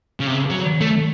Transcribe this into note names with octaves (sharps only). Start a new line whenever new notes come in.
C#3
C3
C#3
F#3
A3